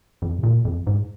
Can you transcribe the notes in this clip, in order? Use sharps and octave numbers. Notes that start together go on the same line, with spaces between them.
F2
C3
A#2
F2
G#2